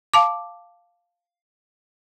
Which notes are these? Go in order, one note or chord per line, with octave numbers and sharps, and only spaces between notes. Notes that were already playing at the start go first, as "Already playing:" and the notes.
F5 A5 D6